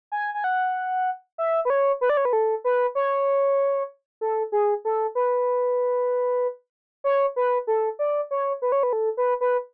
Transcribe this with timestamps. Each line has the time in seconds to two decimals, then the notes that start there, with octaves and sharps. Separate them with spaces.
0.12 G#5
0.34 G#5
0.44 F#5
1.38 E5
1.65 B4
1.70 C#5
2.01 B4
2.10 D5
2.17 C#5
2.25 B4
2.33 A4
2.64 B4
2.95 C#5
4.21 A4
4.52 G#4
4.85 A4
5.15 B4
7.04 C#5
7.36 B4
7.67 A4
7.99 D5
8.31 C#5
8.62 B4
8.72 C#5
8.83 B4
8.93 A4
9.17 B4
9.41 B4